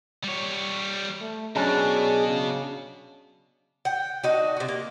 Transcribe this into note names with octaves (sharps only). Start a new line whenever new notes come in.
G3 C#5
A3
B2 F#3 C#4 D4 G#4
C#3
F#5 G5
D4 D#4 F#4
C3 F#4
A#3